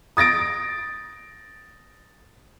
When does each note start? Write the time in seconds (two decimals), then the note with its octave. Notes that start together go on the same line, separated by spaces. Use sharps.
0.17 D#6 A6 A#6 D7